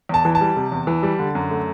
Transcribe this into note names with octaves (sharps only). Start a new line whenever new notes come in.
E2 A5
E3
A5
G3
C3
E2
E3
G3
D3
F#2
A3